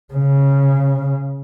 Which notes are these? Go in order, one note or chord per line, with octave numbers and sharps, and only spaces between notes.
C#3